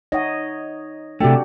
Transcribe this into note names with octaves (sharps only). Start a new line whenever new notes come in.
D#4 C#5 D#5 E5 F#5
C3 A3 D4 F#4 G4 G5